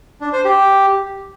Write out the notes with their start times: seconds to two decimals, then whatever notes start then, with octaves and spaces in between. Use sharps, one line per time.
0.21 D4
0.33 C5
0.45 G4